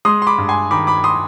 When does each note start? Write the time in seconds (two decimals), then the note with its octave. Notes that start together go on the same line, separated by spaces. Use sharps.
0.05 G#3 C6 D#6
0.22 C6
0.27 B5 D6
0.38 G2
0.49 G#5 C6
0.71 D#3 B5 D6
0.87 B5 D6
1.04 C6 D#6